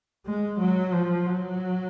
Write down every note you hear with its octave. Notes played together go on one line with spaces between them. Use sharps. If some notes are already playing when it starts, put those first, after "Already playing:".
G#3
F#3
F3
F#3